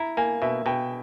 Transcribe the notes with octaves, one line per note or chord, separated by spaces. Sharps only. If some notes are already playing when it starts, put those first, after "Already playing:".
Already playing: E4 A#5
A#3 G#5
B2 E5
B2 G5